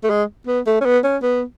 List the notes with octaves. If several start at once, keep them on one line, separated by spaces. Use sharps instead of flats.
A3
G#3
B3
A3
C#4
B3
C#4
B3